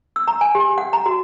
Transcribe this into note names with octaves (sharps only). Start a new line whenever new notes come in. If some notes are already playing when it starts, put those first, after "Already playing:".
E6
A#5
G#5
G4
F#5
A#5
F#4